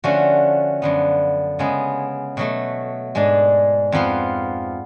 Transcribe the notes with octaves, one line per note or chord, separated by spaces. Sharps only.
D3 F3 A3 C#4 F#4
F#2 D3 F3 B3
C#3 G#3 B3
B2 F#3 A3
G#2 G#3 D4
F2 F3 B3 F4